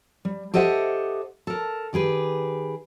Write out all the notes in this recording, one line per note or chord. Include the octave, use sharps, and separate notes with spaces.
G3
G4 A4 C5 D#5 E5 F#5
A4 A#4
D#3 G4 G#4 B4